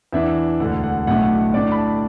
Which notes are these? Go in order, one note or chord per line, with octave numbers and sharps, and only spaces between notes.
E2 E3 D4 E5
E1 D2 D3 F#5
F#5
B1 A2 A3 D4 F#5
A2 A3 D4 D5
B5
A5